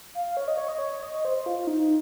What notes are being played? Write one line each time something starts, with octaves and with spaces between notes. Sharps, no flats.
F5
C#5
D#5
C#5
D#5
C#5
D#5
C5
F4
F4
D#4